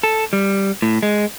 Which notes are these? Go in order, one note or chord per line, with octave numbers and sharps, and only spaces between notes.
A4
G3
A2
G#3